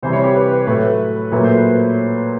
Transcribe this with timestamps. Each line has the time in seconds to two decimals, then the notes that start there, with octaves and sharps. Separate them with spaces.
0.03 C3 E3 G3 C5
0.13 C#5
0.24 G4
0.35 B4
0.51 B4
0.67 A2 F#3 A3 B4
1.32 A#2 F#3 A3 B4
1.44 C5
1.56 B4